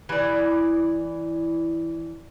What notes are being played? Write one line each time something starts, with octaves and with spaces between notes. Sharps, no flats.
E3 D5